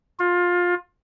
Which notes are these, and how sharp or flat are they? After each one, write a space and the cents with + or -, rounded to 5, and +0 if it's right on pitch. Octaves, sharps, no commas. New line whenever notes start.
F4 +20